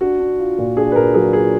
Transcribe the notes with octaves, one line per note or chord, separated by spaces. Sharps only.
D4 F#4
D4
F4
A#2
D4 G#4
B4
A#2 A#4
F#3 G#4
F4 G#4